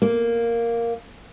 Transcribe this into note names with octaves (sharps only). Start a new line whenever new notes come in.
A#3